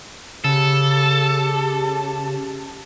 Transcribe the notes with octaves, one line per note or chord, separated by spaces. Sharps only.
C#3 G4 A4